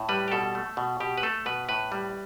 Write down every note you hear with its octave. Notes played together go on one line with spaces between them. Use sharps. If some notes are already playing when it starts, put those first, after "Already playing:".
Already playing: A2
G3 B4
G4
B2 A4
A3
B2
B2 G4
B4
A3 A4
B2 B4
A2 B4
G3